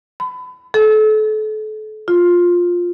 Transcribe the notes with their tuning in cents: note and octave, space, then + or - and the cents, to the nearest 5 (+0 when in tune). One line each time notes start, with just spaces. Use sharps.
B5 +30
A4 -35
F4 +10